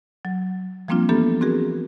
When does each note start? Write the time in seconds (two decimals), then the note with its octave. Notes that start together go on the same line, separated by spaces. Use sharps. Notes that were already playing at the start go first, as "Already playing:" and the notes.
0.25 F#3
0.88 F3 G3 A#3 C4 D4 F4
1.09 E3 A#3 B3 D4 G4 A4
1.41 C4 F#4 G#4 A#4